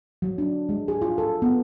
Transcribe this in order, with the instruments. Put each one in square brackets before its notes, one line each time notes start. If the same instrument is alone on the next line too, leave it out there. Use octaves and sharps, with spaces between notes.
[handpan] F#3
D4
G#3
G#4
F4
A4
B3